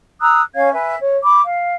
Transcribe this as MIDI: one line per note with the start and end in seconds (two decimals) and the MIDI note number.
0.21 0.42 82
0.21 0.42 87
0.21 0.42 88
0.21 0.42 90
0.54 0.71 61
0.54 0.71 73
0.54 0.71 77
0.54 0.71 92
0.73 0.94 71
0.73 0.94 76
0.73 0.94 80
1.01 1.17 73
1.23 1.41 83
1.23 1.41 86
1.44 1.75 77